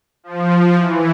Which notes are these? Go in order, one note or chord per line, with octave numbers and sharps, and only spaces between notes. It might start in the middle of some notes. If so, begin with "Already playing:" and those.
F3
E3